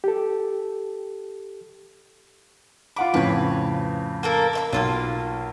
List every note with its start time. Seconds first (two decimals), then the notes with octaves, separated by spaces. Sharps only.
0.04 G4 A4
2.96 F4 F#5 B5 D6
3.14 F2 A2 C#3 B4 C#5
4.23 A#3 A4 A#4
4.53 C#5 E5 B5
4.73 B1 A#3 C#4 F4